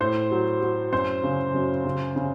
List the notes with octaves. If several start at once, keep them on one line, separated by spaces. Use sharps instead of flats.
A2 C5
F#3
F#3
F#2 C5
C#3
F#2
C#3
C#3